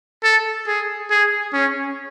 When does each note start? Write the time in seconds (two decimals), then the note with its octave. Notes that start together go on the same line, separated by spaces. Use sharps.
0.24 A4
0.67 G#4
1.11 G#4
1.53 C#4